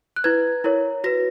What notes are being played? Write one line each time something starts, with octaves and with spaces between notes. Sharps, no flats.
F#6
E4 B4 G#6
E4 A#4 C#5
F#4 B4 A#6